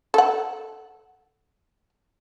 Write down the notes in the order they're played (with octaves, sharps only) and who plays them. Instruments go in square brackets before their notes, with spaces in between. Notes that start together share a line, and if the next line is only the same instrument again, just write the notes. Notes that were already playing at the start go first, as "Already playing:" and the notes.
[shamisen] A4 F#5